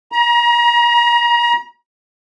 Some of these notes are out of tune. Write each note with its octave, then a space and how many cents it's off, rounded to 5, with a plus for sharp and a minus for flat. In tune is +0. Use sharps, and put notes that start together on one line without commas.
A#5 +35